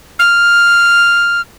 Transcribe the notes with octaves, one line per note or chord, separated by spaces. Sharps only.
F6